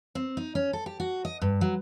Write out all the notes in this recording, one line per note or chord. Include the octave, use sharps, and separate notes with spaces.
C4
D#4
C#4
A4
G4
F#4
D#5
G2
F#3